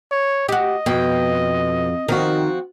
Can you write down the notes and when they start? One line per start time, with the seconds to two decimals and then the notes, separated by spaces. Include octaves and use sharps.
0.12 C#5
0.49 F#4 G4 D#5
0.86 F2 B2 G5
2.08 D#3 F3 C4 F#4 A#4